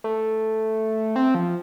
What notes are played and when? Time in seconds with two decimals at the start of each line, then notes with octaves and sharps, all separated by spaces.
0.04 A3
1.16 C4
1.35 F3